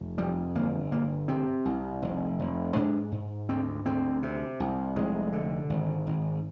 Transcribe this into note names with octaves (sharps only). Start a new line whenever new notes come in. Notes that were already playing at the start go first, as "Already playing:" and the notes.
Already playing: F1
F2 G3
G1 A#3
G1 A#3
C3 C4
C2
F1
F1
G#2 D4
G#2
D2 C4
D2 C4
C3
C2
F1 G#3
D3
G#1
G#1